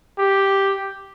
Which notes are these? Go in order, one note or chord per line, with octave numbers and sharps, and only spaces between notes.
G4